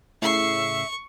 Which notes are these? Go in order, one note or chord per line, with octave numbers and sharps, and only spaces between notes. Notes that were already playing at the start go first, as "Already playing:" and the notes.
A2 C#3 E5 C#6 C7